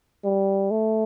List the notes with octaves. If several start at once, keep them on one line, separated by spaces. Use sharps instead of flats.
G3
A3